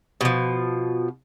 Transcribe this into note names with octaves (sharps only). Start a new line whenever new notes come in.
B2 F3